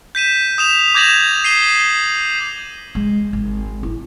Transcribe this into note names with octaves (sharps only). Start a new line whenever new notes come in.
G6 B6 D#7 E7
D#6 E7 F7
D6 G6 G#6 A#6 E7 F#7
C7 D#7 G7
G#3
G#1
E4